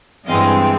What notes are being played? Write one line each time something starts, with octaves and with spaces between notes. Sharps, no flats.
G2 E3 G#3 C4 D#5 F5